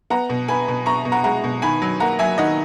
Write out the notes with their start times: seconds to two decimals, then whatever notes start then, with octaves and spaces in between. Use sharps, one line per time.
0.10 B3 F#5 A#5
0.30 B2
0.48 B3 G#5 B5
0.68 B2
0.86 B3 A#5 C#6
1.05 B2
1.12 F#5 A#5
1.24 G#3 F#5 A#5
1.44 B2
1.62 D#3 G#5 B5
1.82 F#3
2.00 A#3 F#5 A#5
2.19 F#3 E5 G#5
2.38 D#3 D#5 F#5